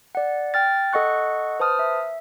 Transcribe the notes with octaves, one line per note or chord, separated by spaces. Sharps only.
D5 F#5
G5 F6 A6
A4 D#5 F#5 C#6 F#6
B4 C5 A5 D#6 F6
E5